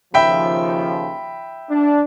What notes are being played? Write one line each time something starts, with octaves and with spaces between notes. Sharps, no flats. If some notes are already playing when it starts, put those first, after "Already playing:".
D#2 C#3 F3 E5 G5 B5
D4